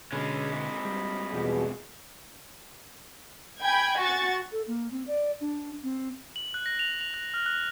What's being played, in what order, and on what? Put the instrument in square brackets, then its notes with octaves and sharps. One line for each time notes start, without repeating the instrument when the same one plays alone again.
[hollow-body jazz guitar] B2 D3 [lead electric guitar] G#3 C#4 [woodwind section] D#5 B5
[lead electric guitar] G#2 C3
[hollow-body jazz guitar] G3
[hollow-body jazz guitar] E2 F3 G3 [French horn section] B2 G#4
[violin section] G5 G#5 B5 G#6
F#4 C#6 A6
[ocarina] A4
A#3
C4
D5
D4
C4
[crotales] F#7
F#6
A#6
F7
F7
F#6
F6
F#6